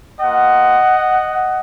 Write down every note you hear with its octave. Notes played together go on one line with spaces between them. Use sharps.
A#3 F4 D#5 F#5